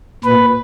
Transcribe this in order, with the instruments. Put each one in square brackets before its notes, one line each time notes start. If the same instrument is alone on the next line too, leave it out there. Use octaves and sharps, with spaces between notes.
[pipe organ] A#2 B4